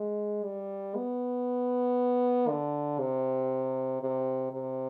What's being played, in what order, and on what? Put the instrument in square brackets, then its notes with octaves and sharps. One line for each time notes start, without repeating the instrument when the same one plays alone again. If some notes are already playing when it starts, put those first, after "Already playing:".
Already playing: [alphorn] G#3
G3
B3
D3
C3
C3
C3